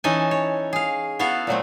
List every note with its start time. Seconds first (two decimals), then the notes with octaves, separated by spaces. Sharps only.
0.04 E3 C#4 D#4 E4 A4 G#5
0.31 C#5
0.73 G#4 F5
1.19 B3 E4 F#4 A4 F5
1.47 A#2 F#3 A3 C4